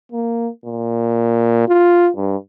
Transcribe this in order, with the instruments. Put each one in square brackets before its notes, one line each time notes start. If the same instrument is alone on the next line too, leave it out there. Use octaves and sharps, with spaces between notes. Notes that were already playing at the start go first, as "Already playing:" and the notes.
[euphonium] A#3
A#2
F4
G2